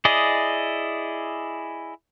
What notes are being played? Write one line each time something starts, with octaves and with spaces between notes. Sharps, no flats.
E4 G#4 D5 D#5